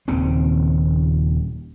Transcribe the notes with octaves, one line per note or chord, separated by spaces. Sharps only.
D#1 D#2 C#3 C4